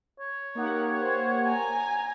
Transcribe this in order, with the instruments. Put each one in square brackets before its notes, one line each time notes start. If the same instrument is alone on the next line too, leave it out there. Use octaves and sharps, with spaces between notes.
[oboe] C#5
[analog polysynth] A#3 G4 F#5 [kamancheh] D#4
[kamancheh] C5
G#5 A#5